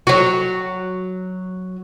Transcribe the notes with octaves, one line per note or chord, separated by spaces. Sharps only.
F#3 F#4